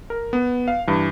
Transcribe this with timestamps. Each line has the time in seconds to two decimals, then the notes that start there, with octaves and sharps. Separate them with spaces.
0.10 A#4
0.33 B3
0.68 F5
0.87 G2 E3